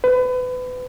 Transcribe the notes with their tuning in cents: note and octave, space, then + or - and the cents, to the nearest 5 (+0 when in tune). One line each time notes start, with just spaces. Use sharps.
B4 +30